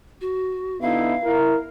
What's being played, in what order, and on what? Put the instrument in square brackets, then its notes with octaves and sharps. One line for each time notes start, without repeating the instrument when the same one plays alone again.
[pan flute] F#4
[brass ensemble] D3 D#4 E4 [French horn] B3 [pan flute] F5
[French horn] E4 [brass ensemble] A#4